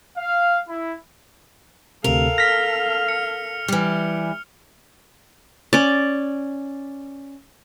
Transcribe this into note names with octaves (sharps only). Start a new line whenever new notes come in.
F5
E4
D2 C3 A4 A#4 F5 F7
F6 A#6 B6
C#7
E3 G3
C#4 D5